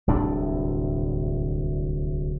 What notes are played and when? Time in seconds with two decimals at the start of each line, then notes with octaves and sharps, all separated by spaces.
0.07 D1 C2 A2 D4